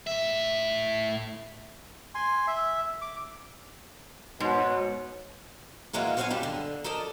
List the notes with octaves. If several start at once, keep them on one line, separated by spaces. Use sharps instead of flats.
A2 E5
G#5 C6
E5
D6
G#2 B2 C#5
B2 E3 F#3 G#3 A#3 F4
F#4 C5 C#5 D#5 F5 G#5
G2 G3 D4
D3
A4 A#4 D5 D#5 A5